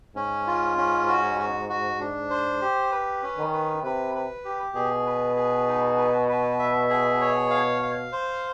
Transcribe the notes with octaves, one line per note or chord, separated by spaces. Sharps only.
G#2 C#4
F4
C#4
F#4
F#4
F#4
D4
C5
G4
B4
C#4
D#3
B4
C3 B4
B4
G4
B2 G#4
B4
G#4
D#4
B4
B4
E5
G#4
C#5
F5
F5
C5